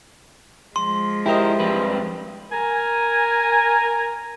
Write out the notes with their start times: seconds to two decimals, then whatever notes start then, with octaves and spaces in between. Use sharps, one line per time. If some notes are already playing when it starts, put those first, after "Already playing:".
0.76 F3 G#3 C6
1.26 E4 G4 A#4 C5 D#5
1.60 F2 G3 B4
2.52 A#4 G#5